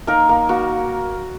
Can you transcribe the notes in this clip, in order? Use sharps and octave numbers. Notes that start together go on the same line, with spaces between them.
A#3 D#4 A#4
A#3
A#3 F#4